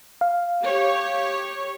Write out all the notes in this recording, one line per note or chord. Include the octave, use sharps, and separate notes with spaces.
F5
G4 C#5